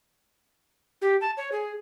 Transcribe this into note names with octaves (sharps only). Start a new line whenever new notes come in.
G4
A5
C#5
G#4